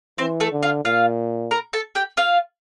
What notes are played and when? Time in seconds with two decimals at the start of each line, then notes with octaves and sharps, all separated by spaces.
0.18 E3 C4 C5
0.40 A3 A4
0.52 D3
0.63 F4 F5
0.84 A#2 F4 F5
1.51 A#4 A#5
1.73 A4 A5
1.95 G4 G5
2.17 F4 F5